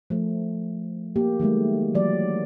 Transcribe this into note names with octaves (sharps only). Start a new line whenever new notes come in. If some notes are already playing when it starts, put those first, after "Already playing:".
F3 A3
A#3 G4
D#3 F#3 G#3 A3
E3 F#3 D5